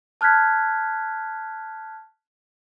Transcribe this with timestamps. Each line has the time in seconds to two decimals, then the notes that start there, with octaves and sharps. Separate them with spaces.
0.21 A5 F6 F#6 G#6 B6